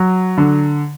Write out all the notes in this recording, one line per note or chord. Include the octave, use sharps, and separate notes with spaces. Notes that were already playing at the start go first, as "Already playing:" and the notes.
Already playing: F#3
D3